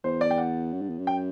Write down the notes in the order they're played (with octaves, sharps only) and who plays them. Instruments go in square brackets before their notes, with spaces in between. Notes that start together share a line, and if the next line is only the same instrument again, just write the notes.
[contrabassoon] E2 [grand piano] C5
[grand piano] D5
G5
F#5
[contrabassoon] F#2
G2
E2
F#2
[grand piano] G5